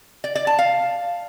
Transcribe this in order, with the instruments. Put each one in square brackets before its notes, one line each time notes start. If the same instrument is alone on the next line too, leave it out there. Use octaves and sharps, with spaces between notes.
[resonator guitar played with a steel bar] D5
D5
A5
F5